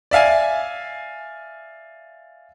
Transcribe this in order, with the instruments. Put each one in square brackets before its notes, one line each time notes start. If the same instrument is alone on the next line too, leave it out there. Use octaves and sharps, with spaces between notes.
[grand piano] D5 E5 F5 G#5